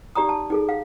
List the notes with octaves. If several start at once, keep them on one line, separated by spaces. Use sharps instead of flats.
D#4 G4 D5 A#5 D#6
A5
D#4 G#4 A4
F5